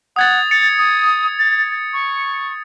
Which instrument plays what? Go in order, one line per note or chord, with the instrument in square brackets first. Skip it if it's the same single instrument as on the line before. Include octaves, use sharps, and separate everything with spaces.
[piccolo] F#5 [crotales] D#6 G#6 A6
[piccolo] A6 [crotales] C#7
[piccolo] D#6
A6
C#6